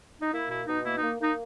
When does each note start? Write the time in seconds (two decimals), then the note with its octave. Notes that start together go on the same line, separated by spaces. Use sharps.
0.21 D#4
0.32 A#3 E4
0.49 B2 E4
0.67 B2 D#4
0.85 A#3 E4
0.97 A#3 D#4
1.19 A#3 D#4